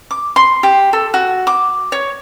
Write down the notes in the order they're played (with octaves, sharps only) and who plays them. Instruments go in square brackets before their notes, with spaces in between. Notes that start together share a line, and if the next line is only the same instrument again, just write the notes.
[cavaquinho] D6
C6
G4
A4
F#4
D6
C#5